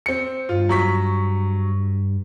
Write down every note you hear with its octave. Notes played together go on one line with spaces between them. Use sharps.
C4 C#7
G2 F4
F#3 C#6 B6